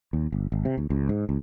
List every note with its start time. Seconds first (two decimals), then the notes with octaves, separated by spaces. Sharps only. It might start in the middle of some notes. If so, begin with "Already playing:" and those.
0.13 D#2
0.32 G1
0.52 G#1
0.65 C3
0.78 D2
0.90 C#2
1.09 G#2
1.29 C#2